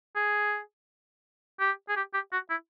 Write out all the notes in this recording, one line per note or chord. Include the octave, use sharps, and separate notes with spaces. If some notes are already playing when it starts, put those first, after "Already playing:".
G#4
G4
G#4
G4
G4
F#4
E4